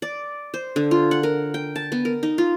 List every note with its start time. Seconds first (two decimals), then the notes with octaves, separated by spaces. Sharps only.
0.02 D5
0.54 C5
0.76 D3
0.91 F4
1.11 F#5
1.23 A#4
1.54 G5
1.76 A5
1.92 B3
2.05 A#4
2.23 D#4
2.38 F4